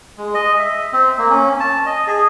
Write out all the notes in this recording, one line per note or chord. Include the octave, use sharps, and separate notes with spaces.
G#3
D#5
E5
C4
A#3
C#4
A5
D#5
G#4